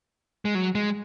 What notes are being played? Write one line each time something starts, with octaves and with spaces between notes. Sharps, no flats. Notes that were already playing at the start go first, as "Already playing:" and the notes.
G#3
F#3
G#3